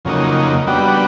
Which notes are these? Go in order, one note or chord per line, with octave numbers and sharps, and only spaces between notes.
F2 C#3 F#3 A#3 D#4
G3 B3 D4 F#4